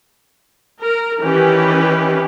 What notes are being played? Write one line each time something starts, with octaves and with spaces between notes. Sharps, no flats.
A#4
D#3 E3 C#4 G4 B4